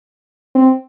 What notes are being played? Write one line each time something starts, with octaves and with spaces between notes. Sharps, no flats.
C4